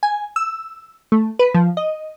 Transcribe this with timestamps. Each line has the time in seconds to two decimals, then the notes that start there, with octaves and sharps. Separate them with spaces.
0.03 G#5
0.36 E6
1.12 A3
1.39 B4
1.54 F3
1.77 D#5